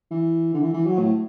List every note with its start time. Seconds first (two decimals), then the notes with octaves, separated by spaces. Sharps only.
0.11 E3
0.54 D3
0.61 E3
0.74 E3
0.87 F#3
0.99 A2